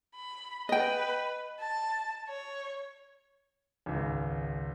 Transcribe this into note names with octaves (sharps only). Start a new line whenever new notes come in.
B5
B4 D#5 G5
A5
C#5
G#1 C#2